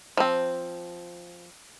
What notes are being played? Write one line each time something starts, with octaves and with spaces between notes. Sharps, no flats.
F3 C4